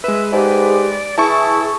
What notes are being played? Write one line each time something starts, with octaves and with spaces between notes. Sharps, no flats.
G#3 B4 E5
G#2 G4 D5
E3 E4 G#4 A5 C#6